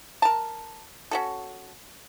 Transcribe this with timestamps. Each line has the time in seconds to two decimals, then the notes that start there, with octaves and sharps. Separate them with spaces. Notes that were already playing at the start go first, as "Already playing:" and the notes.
0.22 A#4 A5
1.11 C#4 F#4 A4